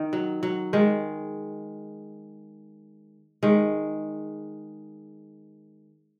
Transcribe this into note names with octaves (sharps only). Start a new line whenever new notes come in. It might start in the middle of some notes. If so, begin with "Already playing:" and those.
Already playing: D#3
F#3
F#3
D#3 G#3
D#3 G#3